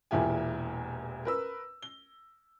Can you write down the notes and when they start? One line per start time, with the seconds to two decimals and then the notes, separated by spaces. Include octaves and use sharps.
0.11 E1 E2 A#2 E4 G4 G#5
1.25 A#4 B4 E6
1.82 G7